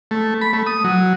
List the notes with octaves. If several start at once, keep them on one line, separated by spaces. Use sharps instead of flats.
A3
B5
A3
D#6
F#3